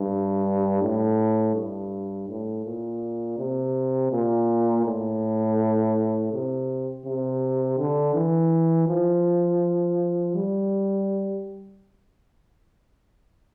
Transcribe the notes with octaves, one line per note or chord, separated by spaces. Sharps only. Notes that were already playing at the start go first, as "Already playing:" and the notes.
Already playing: G2
A2
G2
A2
A#2
C3
A#2
A2
C3
C3
D3
E3
F3
G3